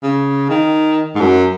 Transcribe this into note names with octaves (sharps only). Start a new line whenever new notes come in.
C#3
D#3
G#2
F#2